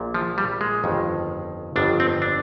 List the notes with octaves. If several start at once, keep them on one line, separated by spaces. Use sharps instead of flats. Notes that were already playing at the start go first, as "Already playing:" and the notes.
Already playing: A#1 A#2
F3
G3
G#3
G1 F2 D#3
G1 F2 D#3 D4
C4
D4